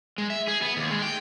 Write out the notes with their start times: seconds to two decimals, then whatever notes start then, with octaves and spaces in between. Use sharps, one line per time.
0.18 G#3
0.30 E5
0.48 G#4
0.62 B3
0.77 D#2
0.90 G#3
1.02 G5